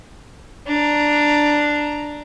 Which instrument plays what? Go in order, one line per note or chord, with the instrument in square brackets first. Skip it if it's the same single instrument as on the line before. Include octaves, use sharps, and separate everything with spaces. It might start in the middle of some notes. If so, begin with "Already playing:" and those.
[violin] D4 A#5